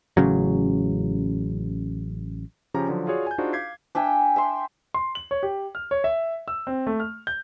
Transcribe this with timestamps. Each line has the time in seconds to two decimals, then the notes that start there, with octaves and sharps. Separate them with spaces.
0.17 A1 C#3 F#3
2.74 C#3 F3 C#4 G4 A#5
2.88 D3 F3 F#3
3.07 F4 F#4 G#4 C#5 D5
3.27 G#5 G6
3.38 D4 D#4 F4 F#4 G#4 C5
3.53 F5 D6 G6 G#6 B6 C7
3.95 D4 E5 G5 G#5
4.36 E5 G5 C6
4.94 C6
5.15 F#7
5.31 C#5
5.43 G4
5.75 F6
5.91 C#5
6.04 E5
6.48 E6
6.67 C4
6.87 A3
7.00 F6
7.27 G6